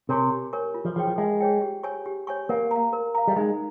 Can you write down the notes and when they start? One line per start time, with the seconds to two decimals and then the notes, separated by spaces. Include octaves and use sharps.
0.09 C3 A#4 C#5 G#5 C#6
0.30 G4
0.53 A#4 C#5 G#5 C#6
0.74 F4
0.85 F3
0.96 F3 G#4 C#5 G5
1.07 F3
1.18 G#3 F4
1.40 G#4 C#5 G5
1.61 G4
1.83 C#5 G#5 C#6
2.06 G4
2.27 C#5 G#5 C#6
2.49 A#3 A#4
2.71 F5 A#5
2.93 A#4
3.15 F5 A#5
3.28 G3
3.36 G#3 D#4